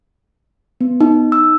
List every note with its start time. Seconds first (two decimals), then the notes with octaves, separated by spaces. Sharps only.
0.81 B3
1.01 D#4
1.32 E6